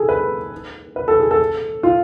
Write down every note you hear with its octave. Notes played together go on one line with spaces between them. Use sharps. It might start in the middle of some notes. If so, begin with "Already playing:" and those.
Already playing: G#4 A4
B4
B4
A4
G#4
A4
F4